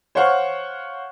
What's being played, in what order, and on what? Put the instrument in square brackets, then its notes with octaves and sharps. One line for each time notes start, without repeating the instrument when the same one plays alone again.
[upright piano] C5 C#5 F5 F#5 C#6 F6